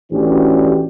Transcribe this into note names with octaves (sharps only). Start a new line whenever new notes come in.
A1 E3 C#4 D4 F#4 G4